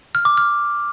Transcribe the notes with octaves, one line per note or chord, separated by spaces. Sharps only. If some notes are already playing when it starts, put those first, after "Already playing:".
F6
D6
F6